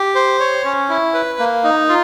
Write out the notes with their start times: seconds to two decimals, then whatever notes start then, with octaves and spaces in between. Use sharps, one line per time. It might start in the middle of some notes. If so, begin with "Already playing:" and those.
Already playing: G4
0.15 C5
0.40 C#5
0.65 C#4
0.89 E4
1.14 B4
1.39 A#3
1.64 D#4
1.89 F4